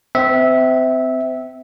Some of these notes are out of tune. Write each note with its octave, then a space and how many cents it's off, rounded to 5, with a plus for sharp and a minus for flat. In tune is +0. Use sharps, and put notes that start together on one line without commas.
C4 -30 E5 -15